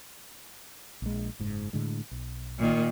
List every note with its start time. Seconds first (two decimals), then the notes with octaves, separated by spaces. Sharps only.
1.02 A#1 G#3
1.39 F#1 G#2
1.73 A2 D3 G#3
2.11 B1
2.59 A#2 D#3